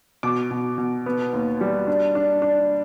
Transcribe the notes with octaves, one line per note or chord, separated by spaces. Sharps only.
B2 D6
B2
B2
B3
D#2
G3
D4
D4
D4